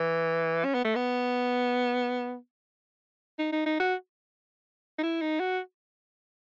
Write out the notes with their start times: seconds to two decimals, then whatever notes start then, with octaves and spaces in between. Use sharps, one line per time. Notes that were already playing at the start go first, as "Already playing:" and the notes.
Already playing: E3
0.65 C#4
0.74 B3
0.85 A3
0.95 B3
3.39 D#4
3.52 D#4
3.66 D#4
3.80 F#4
4.98 D#4
5.03 E4
5.22 D#4
5.40 F#4